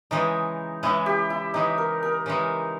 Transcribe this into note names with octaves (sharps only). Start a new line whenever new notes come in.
C#3 E3 G#3 D#4
C#3 E3 G#3 E4
G4
E4
C#3 E3 G#3 D#4
A#4
A#4
C#3 E3 G#3